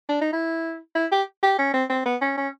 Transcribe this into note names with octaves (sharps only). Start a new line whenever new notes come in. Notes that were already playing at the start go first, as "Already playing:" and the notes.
D4
D#4
E4
E4
G4
G4
C#4
C4
C4
B3
C#4
C#4